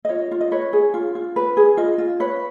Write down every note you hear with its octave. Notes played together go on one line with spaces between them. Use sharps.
D#5
F4 C#5
F4
D#5
B4 C#5
G#4
F4
F4
B4
G#4
F4 D#5
F4
B4 C#5